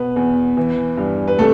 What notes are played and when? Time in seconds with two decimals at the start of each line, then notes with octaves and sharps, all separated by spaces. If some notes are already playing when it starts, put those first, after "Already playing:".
Already playing: B2 B3 B4
0.16 E2
0.57 E3
0.97 G2
1.28 B4
1.38 C3 A3 A4